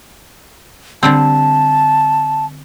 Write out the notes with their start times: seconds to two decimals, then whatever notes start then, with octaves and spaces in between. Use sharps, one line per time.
1.03 D3 G3 C4 A5